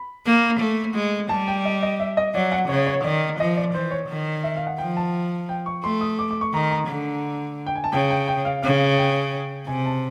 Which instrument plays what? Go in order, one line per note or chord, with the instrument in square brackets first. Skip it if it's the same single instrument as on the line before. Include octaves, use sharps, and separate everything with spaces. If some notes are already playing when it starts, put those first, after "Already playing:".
Already playing: [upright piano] B5
[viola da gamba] A#3
A3
G#3
[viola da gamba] G3 [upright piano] A5
[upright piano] G5
D#5
D#5
E5
D#5
[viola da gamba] F#3 [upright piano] D5
[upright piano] F#5
[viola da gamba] C#3 [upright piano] C#5
[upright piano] C#5
[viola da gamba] D#3 [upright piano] D5
[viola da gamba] F3 [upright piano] D#5
[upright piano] D5
[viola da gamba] E3 [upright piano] C5
[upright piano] C#5
[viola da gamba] D#3
[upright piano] E5
F5
F#5
[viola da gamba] F3 [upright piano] G5
[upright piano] A5
G5
C#6
[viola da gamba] A3 [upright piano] C6
[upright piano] D#6
D6
D6
C#6
[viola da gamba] D#3 [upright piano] A#5
[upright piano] A#5
[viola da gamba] D3
[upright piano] G5
G#5
A5
[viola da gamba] C#3 [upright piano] G5
[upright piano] G5
G5
F5
[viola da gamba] C#3 [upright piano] F5
[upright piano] G5
[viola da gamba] C3 [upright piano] G#5
[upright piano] A5